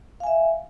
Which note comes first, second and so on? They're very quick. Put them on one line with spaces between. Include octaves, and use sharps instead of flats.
F5 G#5 E5